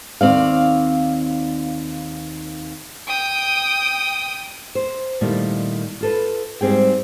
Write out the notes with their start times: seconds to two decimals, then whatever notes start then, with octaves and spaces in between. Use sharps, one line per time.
0.21 D#2 B2 C4 D5 F5
3.08 G5 D#6
4.75 C5
5.21 A#2 D#3 G3 A3 E4
6.01 F4 A4 B4
6.61 G#2 G3 C4 G#4 G5